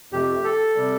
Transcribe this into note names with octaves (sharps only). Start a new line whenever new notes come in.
F2 C3 A3 G4
A4
C3 G3